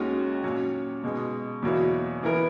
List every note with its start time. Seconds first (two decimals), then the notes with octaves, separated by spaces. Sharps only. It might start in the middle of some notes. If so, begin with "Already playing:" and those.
Already playing: D#2 D#3 G#3 C#4 F#4
0.43 A#2 F#3 C#4
1.04 B2 G#3 D#4
1.62 E2 B2 F#3 A#3 E4
2.23 E3 B3 E4 A#4